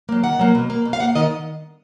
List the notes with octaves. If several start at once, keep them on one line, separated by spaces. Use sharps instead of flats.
F#3 A#3
D#3 F#5
F#3 A#3
B2
A#3
B2
F5
A#3 F#5
D#3 D#5